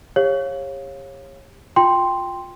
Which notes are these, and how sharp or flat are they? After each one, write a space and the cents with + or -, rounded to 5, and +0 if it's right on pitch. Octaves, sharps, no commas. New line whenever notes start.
G4 +35 C#5 -25 F5 +5
F4 +15 G5 +5 C6 +0